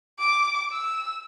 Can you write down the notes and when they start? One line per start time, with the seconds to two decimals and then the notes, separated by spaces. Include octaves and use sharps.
0.19 D6
0.72 E6